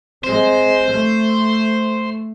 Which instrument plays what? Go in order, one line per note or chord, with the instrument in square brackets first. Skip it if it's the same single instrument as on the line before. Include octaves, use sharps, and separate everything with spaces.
[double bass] G#3 C4 [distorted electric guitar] C5
[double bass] A3